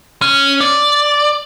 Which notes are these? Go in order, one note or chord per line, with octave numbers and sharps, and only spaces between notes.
C#4
D5